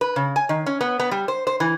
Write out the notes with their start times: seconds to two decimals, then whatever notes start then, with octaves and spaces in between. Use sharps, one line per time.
0.01 B4
0.16 C#3
0.36 G#5
0.49 D#3
0.66 C#4
0.81 B3
1.00 B3
1.11 G3
1.28 C5
1.47 C5
1.60 E3